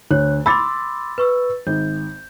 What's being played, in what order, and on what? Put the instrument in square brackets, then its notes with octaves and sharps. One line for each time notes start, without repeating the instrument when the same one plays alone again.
[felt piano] D2 [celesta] C#5 F#6
[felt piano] B5 A6 [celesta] C6 D6 E6
[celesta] B4 C#6 E6
[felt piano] G#1 [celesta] G6